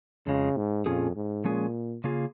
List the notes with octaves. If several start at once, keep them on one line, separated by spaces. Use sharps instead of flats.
F2 C#3 F3 G#3
G#2
F2 A#2 F3 C#4 F4 G#4
G#2
A#2 F3 G#3 C#4 G#4
C#3 A#3 F4 G#4